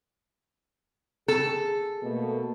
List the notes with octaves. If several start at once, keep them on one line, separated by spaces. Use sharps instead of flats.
G#4 A4
B2 A3 A#3